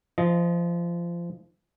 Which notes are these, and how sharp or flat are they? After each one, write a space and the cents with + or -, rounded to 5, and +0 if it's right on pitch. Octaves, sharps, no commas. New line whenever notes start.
F3 -25 D#5 +0